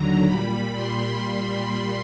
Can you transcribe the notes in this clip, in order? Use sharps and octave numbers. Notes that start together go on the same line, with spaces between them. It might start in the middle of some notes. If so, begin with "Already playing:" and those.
Already playing: D#2 D3 F#3 A#5
A#2 G3 B5
C6